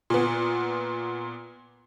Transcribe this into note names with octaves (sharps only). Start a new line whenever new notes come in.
A#2 B3